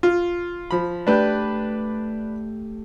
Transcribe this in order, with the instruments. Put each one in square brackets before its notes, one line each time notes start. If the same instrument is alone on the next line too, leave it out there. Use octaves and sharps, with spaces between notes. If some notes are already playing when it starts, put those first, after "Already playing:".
[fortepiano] F4
F3 B5
[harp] A3 G4 [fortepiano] D4 B4 D5